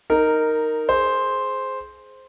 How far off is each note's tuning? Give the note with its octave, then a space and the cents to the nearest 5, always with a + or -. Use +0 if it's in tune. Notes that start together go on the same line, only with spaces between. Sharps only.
D#4 +0 A#4 -10
G#4 +20 C5 +0